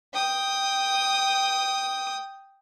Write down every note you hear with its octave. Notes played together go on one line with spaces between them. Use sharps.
G5 D#6